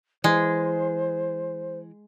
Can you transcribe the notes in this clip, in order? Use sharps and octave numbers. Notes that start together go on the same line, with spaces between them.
E3 G#3 C5